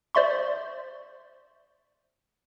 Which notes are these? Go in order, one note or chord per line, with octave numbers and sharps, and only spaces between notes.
C5 D5 E5 C6 C#6